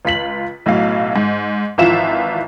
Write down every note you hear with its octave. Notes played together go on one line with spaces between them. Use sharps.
C#2 F4 B6 F#7
B1 A2 F#3 F5
G#2
G#1 E3 F3 F4 E5 E7